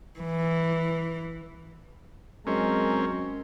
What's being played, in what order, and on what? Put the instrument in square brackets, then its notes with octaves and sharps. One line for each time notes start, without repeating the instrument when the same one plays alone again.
[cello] E3
[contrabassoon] F#2 [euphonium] G#3 [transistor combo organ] C4 C#4 [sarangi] A#4